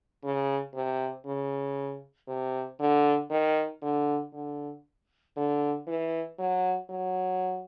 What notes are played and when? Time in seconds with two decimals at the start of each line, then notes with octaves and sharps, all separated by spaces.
0.24 C#3
0.74 C3
1.25 C#3
2.28 C3
2.79 D3
3.30 D#3
3.82 D3
4.33 D3
5.37 D3
5.87 E3
6.39 F#3
6.90 F#3